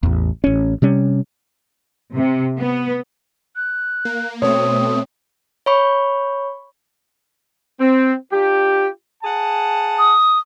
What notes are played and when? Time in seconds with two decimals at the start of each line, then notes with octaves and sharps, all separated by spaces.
0.03 A1 E2
0.44 A1 C#4
0.82 C3 G3 C#4
2.14 C3
2.59 B3
3.56 F#6
4.05 A#3
4.42 B2 A3 C4 C#5 D#6
5.66 C#5 B5 C#6
7.80 C4
8.32 D4 F4 G4
9.23 G#4 F#5 A5
9.98 D#6